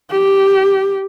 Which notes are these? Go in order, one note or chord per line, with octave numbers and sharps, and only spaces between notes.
G4